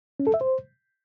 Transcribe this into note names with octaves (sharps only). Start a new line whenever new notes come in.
C#4
A4
E5
C5